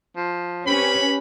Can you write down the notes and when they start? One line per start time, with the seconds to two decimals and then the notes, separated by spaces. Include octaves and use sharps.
0.16 F3
0.67 C4 C#4 G4 B4 B5